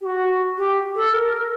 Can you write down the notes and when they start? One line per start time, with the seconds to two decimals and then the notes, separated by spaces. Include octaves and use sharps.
0.01 G4
0.05 F#4
0.58 G4
0.95 A4
1.13 A#4